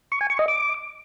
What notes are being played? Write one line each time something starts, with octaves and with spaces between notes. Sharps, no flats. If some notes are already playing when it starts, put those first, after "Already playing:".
C#6
G#5
C#6
D#5
D6